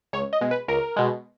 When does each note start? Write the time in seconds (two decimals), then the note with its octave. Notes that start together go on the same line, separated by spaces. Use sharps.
0.13 C#2 C#5
0.33 D#5
0.41 B2 G#3
0.51 B4
0.68 C#2 A#4
0.96 B2 G#3